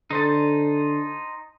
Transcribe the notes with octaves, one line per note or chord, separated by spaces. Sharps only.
D3 D#4 C5 A5